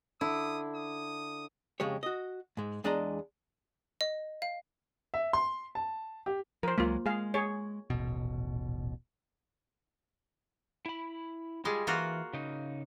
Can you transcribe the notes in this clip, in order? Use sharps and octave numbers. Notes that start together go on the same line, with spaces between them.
D3 E4 D#6
D#6
F2 C#3 G#3 G4 C#5
F#4 D#5
G#2 G#3
E2 G#3 D4 D5 D#5 A#5
D#5
F5
E5
C6
A5
G4
F3 A#4 C5
C#2 F#3 G#3 A#3 F4
G#3 G#4 F5
G#4 C#5
D#1 A1 B2
E4 B5
G3 G#3 F4 G#4
E3 A#3 F4 F#4
C#3 D#4